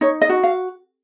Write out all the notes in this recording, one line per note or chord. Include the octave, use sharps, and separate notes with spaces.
D#4 C#5
D#5
F#4
F5